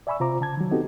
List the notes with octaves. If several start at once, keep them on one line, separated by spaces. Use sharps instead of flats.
D5 E5 G#5 B5 C#6 E6
C3 F4 C5 A#5 D6
C#3 A5 G#6
D#3 F#3
B3 C4 D#4 F#4 G4 A4